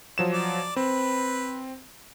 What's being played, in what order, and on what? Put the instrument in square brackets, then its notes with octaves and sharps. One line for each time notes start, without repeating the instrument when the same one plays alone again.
[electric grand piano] F3 F#3 E7
[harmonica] D5
[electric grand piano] C4 [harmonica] B4